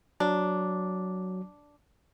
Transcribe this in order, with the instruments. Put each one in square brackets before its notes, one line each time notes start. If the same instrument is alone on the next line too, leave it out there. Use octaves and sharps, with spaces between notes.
[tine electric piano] F#3 [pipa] D4